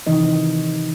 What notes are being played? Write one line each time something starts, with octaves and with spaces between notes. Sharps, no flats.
C3 D#3 E3 D#4 D#5